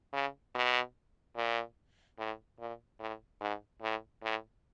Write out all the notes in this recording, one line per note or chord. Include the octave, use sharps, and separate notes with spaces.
C#3
B2
A#2
A2
A#2
A2
G#2
A2
A2